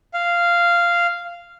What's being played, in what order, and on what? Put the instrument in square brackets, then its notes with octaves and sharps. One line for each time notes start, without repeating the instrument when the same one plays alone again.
[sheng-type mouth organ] F5